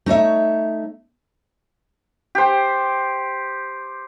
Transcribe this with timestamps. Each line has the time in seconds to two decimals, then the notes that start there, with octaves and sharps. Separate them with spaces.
0.06 A3 D#4 C#5 E5
2.35 G4 C5